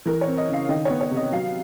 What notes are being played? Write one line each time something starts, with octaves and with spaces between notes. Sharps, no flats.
E3 A#4
C#5
C4
D#5
C#3 F5
D#3 D#5
B3 C#5
C#5
C3
D#5
F#3 F5